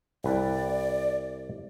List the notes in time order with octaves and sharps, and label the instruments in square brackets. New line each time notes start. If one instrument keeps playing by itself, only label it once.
[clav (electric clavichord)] C2 B4 [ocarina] D5